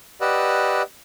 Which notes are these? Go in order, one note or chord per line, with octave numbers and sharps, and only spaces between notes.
G4 B4 D5 D#5 F#5 E6